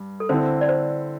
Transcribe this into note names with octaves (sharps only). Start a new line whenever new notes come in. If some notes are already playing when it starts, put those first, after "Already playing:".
Already playing: G2
A4
D3 C4 E4 C5
D5
C5